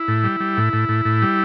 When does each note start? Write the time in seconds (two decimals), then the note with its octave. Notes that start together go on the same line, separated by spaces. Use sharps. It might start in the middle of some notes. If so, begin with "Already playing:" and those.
Already playing: E4
0.08 A2
0.24 G3
0.40 G3
0.57 A2
0.73 A2
0.89 A2
1.05 A2
1.22 G3